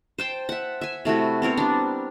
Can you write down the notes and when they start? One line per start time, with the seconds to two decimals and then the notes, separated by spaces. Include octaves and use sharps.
0.18 C5 G5 A5
0.49 E5 F#5
0.81 E5 G#5
1.05 C3 A3 E4 F#4
1.42 B3 C4 A#4 C#5
1.58 G3 D4